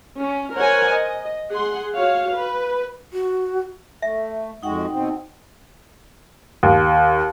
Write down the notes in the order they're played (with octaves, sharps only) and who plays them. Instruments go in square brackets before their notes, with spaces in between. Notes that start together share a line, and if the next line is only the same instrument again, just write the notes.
[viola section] C#4
A#4 C5 C#5 F#5 G#5
D#5
G#4 F#5 C6
F#4 C#5 F5
B4
[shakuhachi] F#4
[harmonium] A3 [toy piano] E5
[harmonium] F2 G#3 F#4 [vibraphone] D#4 F#5 G5
[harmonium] B2 C4
[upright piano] D#2